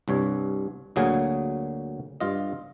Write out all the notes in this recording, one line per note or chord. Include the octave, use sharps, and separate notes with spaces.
C2 G2 C#5
D2 A#2 F#3 G#4 F5
G2 F4 D#5